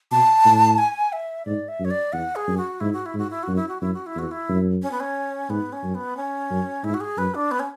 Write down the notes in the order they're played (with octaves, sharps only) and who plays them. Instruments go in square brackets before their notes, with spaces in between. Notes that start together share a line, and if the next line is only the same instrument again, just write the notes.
[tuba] B2 [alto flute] A5
[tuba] A2
[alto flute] G#5
E5
[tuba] G#2 [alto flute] D5
[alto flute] E5
[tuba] F#2
[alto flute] C#5
D5
[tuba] E2 [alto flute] F#5
[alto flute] G#4
[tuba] F#2
[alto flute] F#4
[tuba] G#2 [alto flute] E4
[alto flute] F#4
E4
[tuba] G#2 [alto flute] F#4
[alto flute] E4
[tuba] F#2 [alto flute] F#4
[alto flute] E4
F#4
[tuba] F#2 [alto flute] E4
[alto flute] F#4
E4
[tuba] E2 [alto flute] F#4
[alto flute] E4
[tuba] F#2
[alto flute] C#4
B3
C#4
[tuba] G#2 [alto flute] B3
[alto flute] C#4
[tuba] F#2
[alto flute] B3
C#4
[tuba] F#2
[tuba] G#2 [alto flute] E4
[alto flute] F#4
G#4
[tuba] F#2 [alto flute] B4
[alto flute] D4
B3
C#4